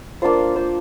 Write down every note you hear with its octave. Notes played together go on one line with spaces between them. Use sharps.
A#3 D4 F4 C5
C5